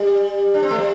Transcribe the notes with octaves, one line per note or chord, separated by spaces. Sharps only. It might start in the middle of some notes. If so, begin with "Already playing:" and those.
Already playing: G3
D4
C4
A3
G3